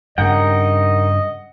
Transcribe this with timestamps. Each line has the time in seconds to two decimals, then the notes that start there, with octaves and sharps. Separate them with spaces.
0.18 G2 C#3 D#4 A#4 D#5 F#5 G5